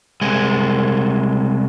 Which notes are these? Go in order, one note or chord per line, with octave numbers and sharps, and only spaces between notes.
C2 G#3